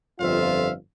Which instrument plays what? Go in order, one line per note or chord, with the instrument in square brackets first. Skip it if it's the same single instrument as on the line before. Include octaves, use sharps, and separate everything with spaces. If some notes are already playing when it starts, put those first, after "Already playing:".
[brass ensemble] G1 F2 F4 C5 E5 F5